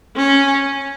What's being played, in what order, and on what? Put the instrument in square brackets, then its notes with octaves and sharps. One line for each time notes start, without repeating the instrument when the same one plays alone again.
[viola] C#4